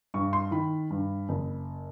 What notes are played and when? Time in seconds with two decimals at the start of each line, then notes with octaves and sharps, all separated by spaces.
0.14 G2 C#6
0.33 C6
0.51 D#3 B5
0.91 G2
1.29 F#1